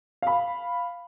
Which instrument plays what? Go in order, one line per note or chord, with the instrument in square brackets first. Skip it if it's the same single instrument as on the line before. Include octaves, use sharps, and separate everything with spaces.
[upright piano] F5 B5